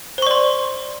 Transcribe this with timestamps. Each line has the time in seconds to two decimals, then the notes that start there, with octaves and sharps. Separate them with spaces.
0.18 C5
0.22 C#6
0.27 D5
0.31 C6